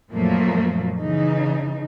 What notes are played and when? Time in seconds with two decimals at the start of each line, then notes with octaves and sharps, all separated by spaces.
0.13 F#2 A#2 F3 F#3 A3 A#3
0.99 C#3 E3 D#4